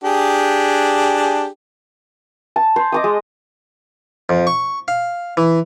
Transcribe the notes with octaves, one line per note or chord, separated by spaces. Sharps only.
D4 G4 G#4
A5
C5
D#5 D6 D#6
G#3
F2
C#6
F5
E3